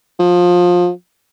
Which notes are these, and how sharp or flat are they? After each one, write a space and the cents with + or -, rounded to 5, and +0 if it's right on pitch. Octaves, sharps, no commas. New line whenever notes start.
F3 +20